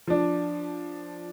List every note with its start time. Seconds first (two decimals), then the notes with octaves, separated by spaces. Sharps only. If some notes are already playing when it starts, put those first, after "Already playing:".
0.07 F3 D4